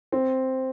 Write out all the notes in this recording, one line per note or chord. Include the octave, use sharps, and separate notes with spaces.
C4